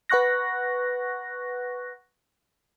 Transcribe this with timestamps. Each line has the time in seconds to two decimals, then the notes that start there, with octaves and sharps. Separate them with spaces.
0.09 B4 F#5 C#6 F#6 A#6